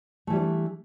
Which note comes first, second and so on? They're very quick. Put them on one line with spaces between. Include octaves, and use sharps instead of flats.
A3 E3 G3 C#4 D4